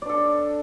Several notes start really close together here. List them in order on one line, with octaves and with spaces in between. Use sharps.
D5 D4 A4